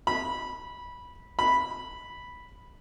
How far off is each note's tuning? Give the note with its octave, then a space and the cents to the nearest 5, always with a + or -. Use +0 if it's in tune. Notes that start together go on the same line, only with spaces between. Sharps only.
B5 -15
B5 -5